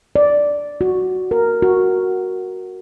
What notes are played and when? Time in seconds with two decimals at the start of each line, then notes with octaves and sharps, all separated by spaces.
0.16 D5
0.81 F#4
1.31 A#4
1.62 F#4